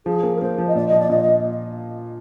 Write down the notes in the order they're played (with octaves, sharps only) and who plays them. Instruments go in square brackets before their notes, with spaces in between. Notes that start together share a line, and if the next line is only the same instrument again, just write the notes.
[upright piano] F3 [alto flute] G#4
[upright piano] A#3
[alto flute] A#4
[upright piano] A#3 [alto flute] C5
[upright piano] F3
[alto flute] D#5
[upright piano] A#2 [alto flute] D5
[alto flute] D#5
[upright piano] F3
[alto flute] D5
[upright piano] A#2 [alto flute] D#5
[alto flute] D5
D#5